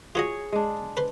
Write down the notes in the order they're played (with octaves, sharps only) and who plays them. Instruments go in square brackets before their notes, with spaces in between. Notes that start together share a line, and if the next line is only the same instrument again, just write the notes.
[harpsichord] F4 F#4 D#5 [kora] G#4 C#5
[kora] G#3 D4
[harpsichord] B4 C5